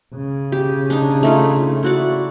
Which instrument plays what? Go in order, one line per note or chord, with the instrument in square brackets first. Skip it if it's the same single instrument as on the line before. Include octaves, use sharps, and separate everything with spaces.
[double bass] C#3
[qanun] G4
D4 D#4
A3 D#4 F4
E4 F#4 D5